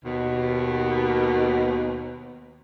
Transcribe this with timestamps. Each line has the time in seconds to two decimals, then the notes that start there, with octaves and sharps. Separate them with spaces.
0.04 D#2 B2